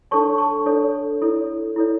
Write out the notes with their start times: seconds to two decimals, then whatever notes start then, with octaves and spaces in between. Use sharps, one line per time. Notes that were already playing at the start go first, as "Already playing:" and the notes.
0.11 D4 A4 C#5 A5 C#6
0.38 A5 C#6
0.66 D4 A4 C#5
1.22 E4 A4 C#5
1.76 E4 A4 C#5